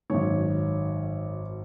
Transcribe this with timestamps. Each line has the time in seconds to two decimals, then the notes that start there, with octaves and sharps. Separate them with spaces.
0.10 G#1 F#2 D#3 C#5